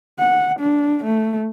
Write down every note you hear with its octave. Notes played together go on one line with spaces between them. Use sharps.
F#5
D4
A3